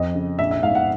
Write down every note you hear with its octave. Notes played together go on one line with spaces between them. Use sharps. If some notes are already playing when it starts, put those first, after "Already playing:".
Already playing: F2 D#5
C#3
A#1 E5
E5
G#2 F5
F#5